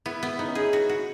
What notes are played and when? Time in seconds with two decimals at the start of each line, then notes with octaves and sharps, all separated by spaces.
0.06 B3 E4
0.23 B3
0.39 B3 D#4
0.48 C#4
0.55 D#4 G#4
0.64 E4
0.73 F#4
0.89 F#4